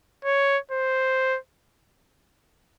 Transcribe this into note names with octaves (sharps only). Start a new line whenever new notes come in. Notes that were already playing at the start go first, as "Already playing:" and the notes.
C#5
C5